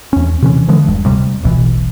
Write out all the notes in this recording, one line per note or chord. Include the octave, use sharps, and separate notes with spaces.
E2 C#4
C3 E3 C#4
D3 E3 F3 G#3
E1 G2
D2 C3 G3
D1 A#1 B2 E3